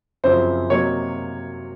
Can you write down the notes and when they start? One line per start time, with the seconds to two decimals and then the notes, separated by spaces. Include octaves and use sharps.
0.24 F#2 C#3 F3 C4 C5
0.70 C3 F#3 A#3 D#4 C#5